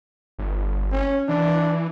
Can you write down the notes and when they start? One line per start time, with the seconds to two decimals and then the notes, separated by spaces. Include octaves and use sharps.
0.38 G1
0.93 C#4
1.29 E3 D4